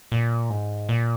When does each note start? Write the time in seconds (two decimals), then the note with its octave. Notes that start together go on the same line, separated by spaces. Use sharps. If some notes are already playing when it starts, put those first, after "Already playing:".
0.12 A#2
0.50 G#2
0.89 A#2